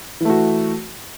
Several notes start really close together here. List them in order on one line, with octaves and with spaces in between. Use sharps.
E3 A3 F#4